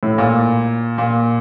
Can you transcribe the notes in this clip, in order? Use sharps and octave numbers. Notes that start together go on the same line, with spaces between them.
A2
A#2
A#2